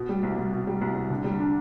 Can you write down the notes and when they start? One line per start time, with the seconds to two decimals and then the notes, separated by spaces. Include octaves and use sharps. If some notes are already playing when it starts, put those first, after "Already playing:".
Already playing: B2
0.09 G3
0.23 C2
0.38 C2
0.52 B2
0.67 G3
0.81 C2
0.95 C2
1.10 D3
1.24 G3
1.40 D4